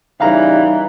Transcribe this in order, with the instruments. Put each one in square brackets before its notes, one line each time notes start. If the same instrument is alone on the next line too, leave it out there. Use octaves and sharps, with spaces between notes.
[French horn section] C#3 G3 D#4 [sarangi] E3 [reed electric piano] F5 A#5